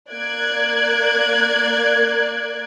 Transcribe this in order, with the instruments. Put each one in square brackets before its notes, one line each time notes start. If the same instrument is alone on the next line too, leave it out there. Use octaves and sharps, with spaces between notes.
[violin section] A#3 D5 F#6 G#6